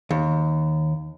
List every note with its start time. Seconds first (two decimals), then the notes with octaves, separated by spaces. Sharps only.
0.11 D#2